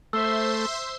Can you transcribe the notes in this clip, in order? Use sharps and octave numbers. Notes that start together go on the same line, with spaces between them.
A3 C5 E5 C6 E6